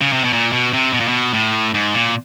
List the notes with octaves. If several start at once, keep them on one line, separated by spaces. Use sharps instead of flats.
C#3
C3
B2
A#2
B2
C3
B2
A#2
B2
A2
G#2
A#2